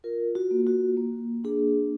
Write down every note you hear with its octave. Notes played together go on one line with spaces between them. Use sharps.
F4 A#4
F#4
A#3
F#4
A#3
D4 G#4